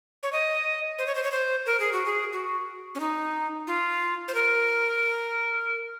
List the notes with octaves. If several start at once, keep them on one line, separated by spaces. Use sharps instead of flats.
C#5
D#5
C5
C#5
C5
C#5
C5
A#4
G#4
F#4
G#4
F#4
C#4
D#4
F4
C5
A#4